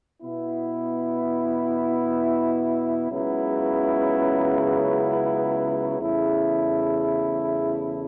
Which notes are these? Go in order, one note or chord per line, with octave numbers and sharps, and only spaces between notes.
B2 B3 E4
C#2 C#3 F#3 B3 E4
E2 C#3 A3 E4